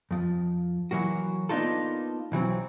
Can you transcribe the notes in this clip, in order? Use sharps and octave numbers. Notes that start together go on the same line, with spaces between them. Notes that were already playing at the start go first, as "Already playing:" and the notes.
F2 F3
E3 F#3 A#3 F#4
A#3 B3 D4 D#4 F4 A4
B1 E3 F#3 C4